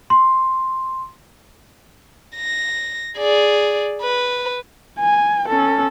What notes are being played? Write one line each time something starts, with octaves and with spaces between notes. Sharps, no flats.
C6
A#6
G#4 D5
B4
G#5
C#4 A4